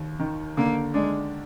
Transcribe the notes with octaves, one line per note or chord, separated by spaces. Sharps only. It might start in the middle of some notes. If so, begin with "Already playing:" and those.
Already playing: D#2
D#3
D3 A#3
G#3 D4